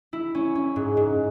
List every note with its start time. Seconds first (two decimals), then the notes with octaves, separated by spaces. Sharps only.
0.13 E4
0.35 C#4
0.55 C#4
0.76 G#2
0.97 G#2